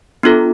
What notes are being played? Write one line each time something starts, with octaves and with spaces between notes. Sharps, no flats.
B3 D4 F4 A4